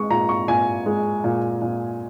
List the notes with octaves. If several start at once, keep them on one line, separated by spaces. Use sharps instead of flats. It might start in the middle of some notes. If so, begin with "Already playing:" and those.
Already playing: G#3 C#6
A#2 A#5
C#6
A#2 G#5
G#3
A#2
A#2